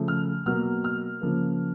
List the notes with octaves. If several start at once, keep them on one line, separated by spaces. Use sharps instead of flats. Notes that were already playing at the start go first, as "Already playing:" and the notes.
Already playing: C#3 F3 A3
F6
B2 F#3 A#3 F6
F6
C#3 F3 A#3